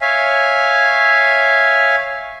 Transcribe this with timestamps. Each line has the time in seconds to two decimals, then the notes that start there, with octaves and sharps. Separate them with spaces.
0.01 C#5 E5 F5 G#5